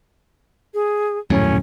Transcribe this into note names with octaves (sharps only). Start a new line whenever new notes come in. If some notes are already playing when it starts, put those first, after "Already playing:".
G#4
D#1 F#2 A2 C#4